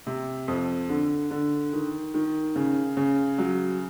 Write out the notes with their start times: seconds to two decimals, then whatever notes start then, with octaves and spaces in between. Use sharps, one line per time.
0.07 C3
0.48 F2
0.89 D3
1.31 D3
1.73 D#3
2.14 D#3
2.55 C#3
2.97 C#3
3.38 F#3